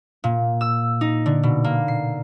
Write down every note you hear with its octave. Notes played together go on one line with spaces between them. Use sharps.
A#2
E6
D#4
D3
B2
A#3
C7